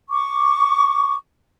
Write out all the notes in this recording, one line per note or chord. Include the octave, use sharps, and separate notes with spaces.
C#6 D6